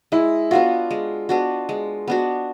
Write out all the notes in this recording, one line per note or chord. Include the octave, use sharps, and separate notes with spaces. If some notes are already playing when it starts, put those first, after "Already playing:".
G#3 E4
B3 D4 F4 F#4
G#3
B3 D4 F#4
G#3
B3 D4 F#4